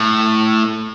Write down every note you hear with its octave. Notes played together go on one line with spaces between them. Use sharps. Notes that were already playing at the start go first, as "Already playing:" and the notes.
Already playing: A2